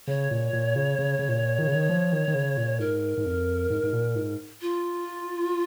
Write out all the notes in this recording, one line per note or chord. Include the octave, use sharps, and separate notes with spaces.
C#3 C#5
A#2
A#2
C#3
C#3
C#3
A#2
D#3
C#3
D#3
F3
D#3
D#3
C#3
A#2
G#2 A#4
G#2
F2
G#2
G#2
A#2
G#2
F4